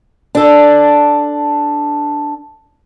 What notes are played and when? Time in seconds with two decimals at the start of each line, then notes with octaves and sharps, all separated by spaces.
0.35 D4 A4